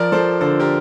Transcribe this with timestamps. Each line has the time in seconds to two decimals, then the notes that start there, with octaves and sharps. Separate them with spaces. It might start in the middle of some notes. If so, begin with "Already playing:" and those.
Already playing: F3 A#4 D5
0.12 F3 A4 C5
0.41 D3 A4 C5
0.59 G4 A#4